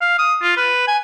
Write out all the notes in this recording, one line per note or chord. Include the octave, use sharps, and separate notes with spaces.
F5
D#6
F4
B4
G#5